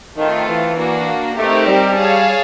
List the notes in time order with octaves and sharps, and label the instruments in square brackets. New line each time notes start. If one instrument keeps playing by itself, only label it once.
[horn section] D#3 [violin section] A3 C4 F4
[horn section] E3
[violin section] A#3 D4 F#4
[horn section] A3 [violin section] C4 D#4 G4 A#4
[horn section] G3
[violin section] G#4 C#5 F5 A5